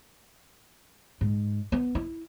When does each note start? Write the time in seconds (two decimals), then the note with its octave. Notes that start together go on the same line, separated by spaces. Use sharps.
1.21 G#2
1.72 B3
1.95 E4